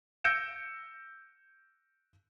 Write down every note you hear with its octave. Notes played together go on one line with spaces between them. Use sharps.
E6 G6 A#6 C#7 D7 E7